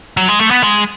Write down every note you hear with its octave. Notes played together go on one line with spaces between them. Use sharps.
F#3
G#3
A3
B3
G#3